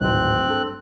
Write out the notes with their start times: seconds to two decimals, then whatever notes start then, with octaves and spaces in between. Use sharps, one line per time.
0.01 D1 G#1 C4 F#6
0.46 G2 A4